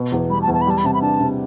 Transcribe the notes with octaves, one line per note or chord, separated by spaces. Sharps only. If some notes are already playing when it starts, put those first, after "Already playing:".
Already playing: B2
E2
G3 B5
A5
E2
A5
B5
G3 A5
B5
C3 A5
B5
D4 A5
C3